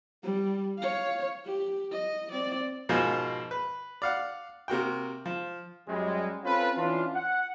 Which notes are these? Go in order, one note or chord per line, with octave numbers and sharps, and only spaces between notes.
G3
C#5 F5
G4
D#5
C4 D5
G#2 B2 F3 A#4 C5 G#5
B4
D5 F5 F#5
C3 A#3 F#4 G5
F3
F#2 G3 G#3
C4 C#4 F4 A4 B4
E3 C#4 D4 F4
F#5